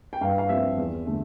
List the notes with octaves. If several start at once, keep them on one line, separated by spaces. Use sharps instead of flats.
G5
G2 F5
F5
F3 C4 E5
E2
D3 A3